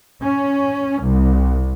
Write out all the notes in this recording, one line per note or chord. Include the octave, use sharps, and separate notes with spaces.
C#4
C2